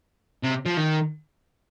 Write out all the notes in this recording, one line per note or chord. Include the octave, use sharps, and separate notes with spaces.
C3
F3
D#3